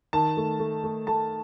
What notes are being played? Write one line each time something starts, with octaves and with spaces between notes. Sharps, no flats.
D#3 A5
A3
A3
A3
A3 A5